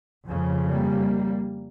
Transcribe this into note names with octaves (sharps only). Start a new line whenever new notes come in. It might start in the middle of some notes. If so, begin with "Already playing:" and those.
F2 C#3
G3 A#3